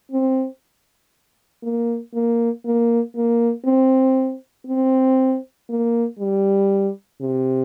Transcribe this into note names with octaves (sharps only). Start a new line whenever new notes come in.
C4
A#3
A#3
A#3
A#3
C4
C4
A#3
G3
C3